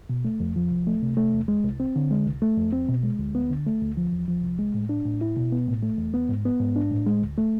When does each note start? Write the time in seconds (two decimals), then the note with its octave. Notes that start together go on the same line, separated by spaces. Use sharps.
0.09 B2
0.25 A3
0.40 F2
0.56 F3
0.71 C2
0.87 A3
1.02 C3
1.17 A3
1.33 E2
1.48 G#3
1.65 C2
1.80 C4
1.96 D3
2.11 G#3
2.26 C2
2.42 A3
2.57 F2
2.73 C4
2.88 B2
3.03 G#3
3.19 D2
3.35 B3
3.50 D3
3.66 A3
3.81 D2
3.97 F3
4.12 E2
4.28 F3
4.43 C2
4.59 G#3
4.74 A2
4.89 D4
5.05 A2
5.21 E4
5.37 B2
5.52 B3
5.68 A2
5.83 A3
5.98 E2
6.14 B3
6.29 G#2
6.45 B3
6.60 G#2
6.76 D4
6.92 A2
7.06 G#3
7.22 D2
7.38 A3